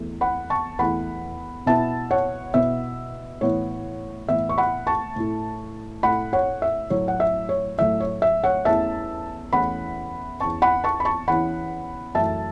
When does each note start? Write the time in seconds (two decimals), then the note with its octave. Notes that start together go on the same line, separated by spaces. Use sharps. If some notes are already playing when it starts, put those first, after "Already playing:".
Already playing: E2 E3 A3
0.21 F#5 B5
0.50 A5 C#6
0.79 E2 E3 A3 F#5 B5
1.66 B2 B3 E4 E5 A5
2.11 C#5 F#5
2.54 B2 B3 E4 E5
3.41 A2 E3 B3 C#5
4.29 A2 E3 B3 E5
4.49 C#6
4.58 F#5 B5
4.87 A5 C#6
5.16 A2 A3 E4
6.03 A2 A3 E4 F#5 B5
6.33 C#5 F#5
6.62 E5
6.90 A2 F#3 A3 E4 C#5
7.08 F#5
7.20 E5
7.49 C#5
7.78 A2 F#3 A3 E4 E5
8.00 C#5
8.22 E5
8.44 C#5 F#5
8.65 E2 E3 A3 C#4 E5 A5
9.53 E2 E3 A3 C#4 F#5 B5
10.40 E2 E3 C#4 A5 C#6
10.62 F#5 B5
10.84 A5 C#6
11.00 B5
11.05 A5 C#6
11.28 E2 E3 C#4 F#5 B5
12.15 F#2 E3 A3 E5 A5